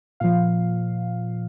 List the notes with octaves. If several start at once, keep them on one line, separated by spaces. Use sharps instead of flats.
A#2 F3 F5